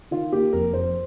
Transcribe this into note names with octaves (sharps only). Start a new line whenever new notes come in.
D#3 F4
A#3 G4
F1 A#4
F2 C5